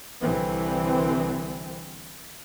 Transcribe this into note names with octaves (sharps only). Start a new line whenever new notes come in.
C2 D3 E3 C4